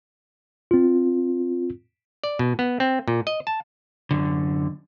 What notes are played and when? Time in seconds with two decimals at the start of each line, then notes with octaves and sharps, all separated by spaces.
0.71 C4 F4
2.24 D5
2.39 B2
2.59 B3
2.80 C4
3.08 A#2
3.27 D#5
3.47 A5
4.11 F#2 D3